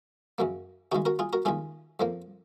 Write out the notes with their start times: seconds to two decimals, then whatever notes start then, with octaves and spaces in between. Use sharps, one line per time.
0.38 F#2 C#3 F#3 A#3
0.92 D#2 C#3 G#3 D#4 F#4
1.05 F#4 A#4
1.19 F4 G#4
1.33 F#4 A#4
1.45 D#2 C#3 G#3 F4 G#4
2.00 F2 F3 A#3